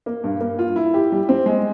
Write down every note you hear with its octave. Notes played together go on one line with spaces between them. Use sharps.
A#3
G2
A#3
F4
E4
G4
G3
C4
G#3